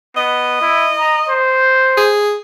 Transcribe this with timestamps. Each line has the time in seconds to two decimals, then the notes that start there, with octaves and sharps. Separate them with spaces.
0.17 B3 D#5
0.62 E4
0.99 A#5
1.29 C5
1.98 G#4